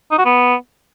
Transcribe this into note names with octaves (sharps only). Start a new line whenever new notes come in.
D#4
F#4
B3